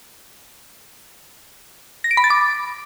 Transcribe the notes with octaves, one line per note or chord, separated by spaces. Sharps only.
A#6
D7
B5
A6
D6